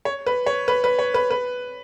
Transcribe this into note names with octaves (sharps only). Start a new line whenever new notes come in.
C#5
B4
C#5
B4
B4
C#5
B4
B4